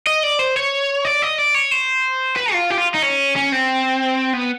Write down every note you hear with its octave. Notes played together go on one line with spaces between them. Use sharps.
D#5
D5
C5
C#5
D5
D#5
D5
C#5
C5
B4
F4
G4
F4
D#4
C#4
C#4
C4
B3